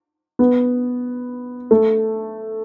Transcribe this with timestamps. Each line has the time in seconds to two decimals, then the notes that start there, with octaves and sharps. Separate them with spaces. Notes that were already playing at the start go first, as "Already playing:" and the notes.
0.39 B3
1.71 A3